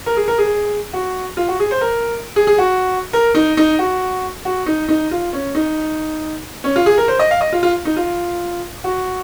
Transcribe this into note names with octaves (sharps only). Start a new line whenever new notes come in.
A#4
G#4
A#4
G#4
F#4
F4
F#4
G#4
C5
A#4
G#4
G#4
F#4
A#4
D#4
D#4
F#4
F#4
D#4
D#4
F4
C#4
D#4
C#4
F4
G#4
A#4
C5
D#5
F5
D#5
F4
F4
D#4
F4
F#4